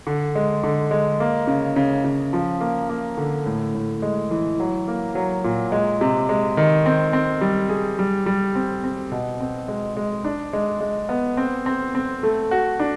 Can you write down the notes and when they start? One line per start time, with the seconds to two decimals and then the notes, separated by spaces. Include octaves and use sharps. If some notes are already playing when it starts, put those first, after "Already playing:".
0.07 D3
0.35 G#3
0.63 D3
0.91 G#3
1.20 A#3
1.47 C#3
1.76 C#3
2.04 C#3
2.33 F3
2.61 A#3
2.89 A#3
3.17 D3
3.46 A2
3.75 A2
4.02 G#3
4.31 E3
4.60 F#3
4.88 A#3
5.15 F#3
5.44 A#2
5.72 G#3
6.01 C3
6.29 G#3
6.57 D#3
6.86 C4
7.13 C4
7.41 G3
7.69 G#4
7.99 G3
8.26 G3
8.55 C4
8.84 C4
9.12 B2
9.40 C4
9.68 G#3
9.97 G#3
10.24 D4
10.53 G#3
10.81 G#3
11.09 B3
11.37 C4
11.66 C4
11.95 C4
12.23 A3
12.51 F#4
12.79 D4